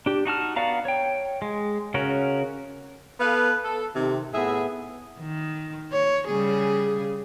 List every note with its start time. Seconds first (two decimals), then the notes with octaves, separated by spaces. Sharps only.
0.06 D4 G4
0.25 D#4 F#4 A5 F6
0.56 B3 F#4 D5 F5 A#5
0.85 C#5 G5
1.42 G#3
1.94 C#3 C#4 F#4 A#4
3.20 B3 A4 B4 F5
3.63 A4
3.96 C3 D#3
4.33 A2 B3 G#4 E5
5.20 D#3
5.92 C#5
6.27 C#3 G3 G#4